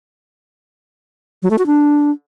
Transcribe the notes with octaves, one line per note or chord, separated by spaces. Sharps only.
F#3
A3
F#4
D4